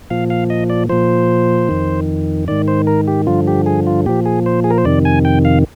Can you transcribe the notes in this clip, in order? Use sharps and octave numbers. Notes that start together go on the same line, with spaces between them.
A#2 F3 F5
F5
D#5
D5
A#2 F3 C5
F2 D#3
G#2 D#3 D5
C5
A#4
G4
G2 D3 F3 F4
G4
G#4
F4
A#2 F3 G4
G#4
C5
G#4
A#4
C5
F2 C3 D#3 D5
G#5
G5
F5